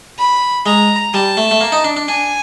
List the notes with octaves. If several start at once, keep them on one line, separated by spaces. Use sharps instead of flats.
B5
G#3 A#5
G3 A5
A3
A3
A#3
D#4
D4
D4
D4 G#5